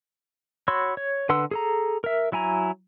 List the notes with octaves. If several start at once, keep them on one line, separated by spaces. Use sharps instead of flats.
F#4 C#5 B5 C6 E6
C#5
D3 B4 F#5 C6 E6
G#4 A4 A#5
A#4 E5
F#3 E4 G#5 A#5